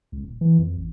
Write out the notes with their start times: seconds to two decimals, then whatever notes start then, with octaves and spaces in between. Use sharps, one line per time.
0.12 C#2
0.24 D#1
0.41 E3
0.59 F2
0.77 A1